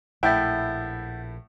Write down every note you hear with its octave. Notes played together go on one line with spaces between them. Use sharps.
A#1 A2 E4 E5 F#5 G5 G6 A6